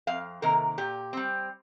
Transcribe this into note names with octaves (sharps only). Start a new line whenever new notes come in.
F2 F5
C3 D#3 A#3 A#4
A#2 G4
G3 C4